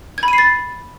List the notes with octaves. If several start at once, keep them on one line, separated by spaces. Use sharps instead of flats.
G#6
B5
D#7
C7
A6